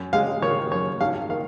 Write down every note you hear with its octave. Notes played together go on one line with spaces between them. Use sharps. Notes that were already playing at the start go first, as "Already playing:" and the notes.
Already playing: F#2
G#3 F5
D#3 C#5
F#2 C#5
G#1 F5
D#3 F5